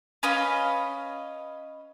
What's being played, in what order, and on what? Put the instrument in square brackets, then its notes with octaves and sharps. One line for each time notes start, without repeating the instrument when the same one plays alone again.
[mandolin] C#4 B4 D#5 F5